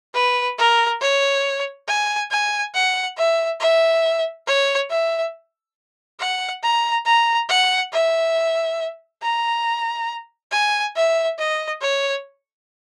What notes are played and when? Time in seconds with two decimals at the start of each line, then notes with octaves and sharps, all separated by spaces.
0.14 B4
0.58 A#4
1.01 C#5
1.88 G#5
2.31 G#5
2.75 F#5
3.17 E5
3.60 E5
4.47 C#5
4.90 E5
6.20 F#5
6.63 A#5
7.06 A#5
7.49 F#5
7.93 E5
9.22 A#5
10.52 G#5
10.96 E5
11.39 D#5
11.82 C#5